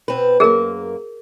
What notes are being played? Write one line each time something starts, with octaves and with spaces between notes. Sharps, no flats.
B2 C4 B4
F#2 A#3 G#4 A#4